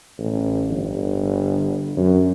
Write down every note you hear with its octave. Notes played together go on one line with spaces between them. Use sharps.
A1
G1
F#2